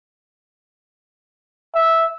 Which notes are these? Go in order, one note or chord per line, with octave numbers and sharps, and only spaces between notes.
E5